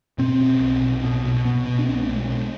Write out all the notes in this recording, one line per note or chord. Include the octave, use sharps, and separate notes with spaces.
B2 C4
B2
B1
B1
B2
B2
B2 B3
B2
D4
B1 C4
B3
A3
B1 G#3
B2